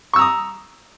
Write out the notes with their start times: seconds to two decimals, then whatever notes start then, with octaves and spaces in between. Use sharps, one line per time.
0.13 C#6
0.16 E6
0.19 A#5
0.21 D#6